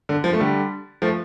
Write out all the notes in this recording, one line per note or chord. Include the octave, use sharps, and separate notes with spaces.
D3
F3
A3
D3 G3
F3 A3